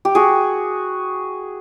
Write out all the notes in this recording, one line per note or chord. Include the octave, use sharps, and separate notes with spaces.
G4
F#4 G#4